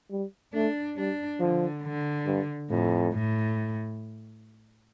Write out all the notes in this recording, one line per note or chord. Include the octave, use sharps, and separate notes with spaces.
G3
A3 D4
G3 D4
D3 F3
D3
G2
F2 A2
A2